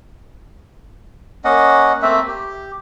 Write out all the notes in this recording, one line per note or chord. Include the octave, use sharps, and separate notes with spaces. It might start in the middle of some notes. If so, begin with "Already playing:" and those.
A#3 C#4 D#5 F#5
A3 A#3 C4 E5
G4